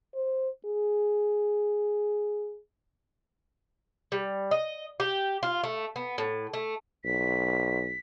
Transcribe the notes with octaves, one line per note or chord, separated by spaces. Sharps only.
C5
G#4
G3
D#5
G4
F4
A3
B3
A2
A3
B1 B6